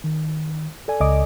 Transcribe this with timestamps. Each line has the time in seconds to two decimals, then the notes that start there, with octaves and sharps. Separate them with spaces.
0.04 D#3
0.88 A4 D5 G#5
1.00 C#2 D#5 D6